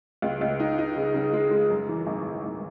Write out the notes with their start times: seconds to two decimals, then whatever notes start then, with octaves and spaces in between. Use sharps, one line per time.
0.22 C#2
0.41 C#2
0.60 D#4
0.78 D#4
0.96 C#3
1.14 C#3
1.33 G#3
1.51 G#3
1.70 F#2
1.89 E3
2.06 G#1
2.25 F#2
2.43 G#1